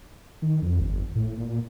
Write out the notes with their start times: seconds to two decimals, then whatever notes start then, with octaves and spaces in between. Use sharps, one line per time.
0.42 D#3
0.62 F2
0.80 G1
1.15 A2
1.37 A#2